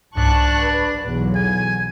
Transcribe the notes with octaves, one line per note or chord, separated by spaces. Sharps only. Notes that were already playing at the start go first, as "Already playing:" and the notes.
C2 G#2 D4 A5 C#6 F#6
G#1 B4
B1 E2 F#3
G#5